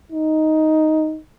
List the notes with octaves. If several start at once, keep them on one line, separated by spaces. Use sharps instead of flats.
D#4